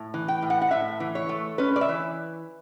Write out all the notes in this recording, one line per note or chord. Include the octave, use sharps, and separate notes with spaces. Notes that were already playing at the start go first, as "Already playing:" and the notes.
Already playing: A2
E3
G5
A2
F#5
F#5
A2 E5
E3
C#5
A3
C#4 B4
D5
E5
E3